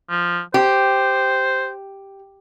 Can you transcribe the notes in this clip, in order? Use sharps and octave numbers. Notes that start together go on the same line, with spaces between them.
F3
G4 C5